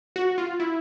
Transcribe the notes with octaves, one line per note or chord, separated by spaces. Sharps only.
F#4
F4
E4